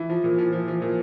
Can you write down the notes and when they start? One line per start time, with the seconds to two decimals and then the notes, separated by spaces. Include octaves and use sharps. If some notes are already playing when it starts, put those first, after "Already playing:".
Already playing: E3
0.10 F3
0.24 A#2
0.38 F3
0.53 F3
0.68 F3
0.82 A#2